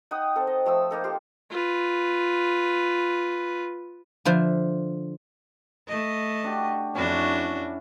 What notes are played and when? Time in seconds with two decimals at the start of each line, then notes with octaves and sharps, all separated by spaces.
0.11 D#4 F#5 G5 D#6
0.36 C4 A4
0.47 D#5
0.66 F3 A3 D#6 E6
0.91 A#3 D#4 A4
1.04 F4 G4 C5 F5
1.51 F4 B4
4.25 D3 F3 C5 E5
5.88 A3 D#5
6.44 D4 F#4 G4
6.95 F2 C#4 D4 E4 F#4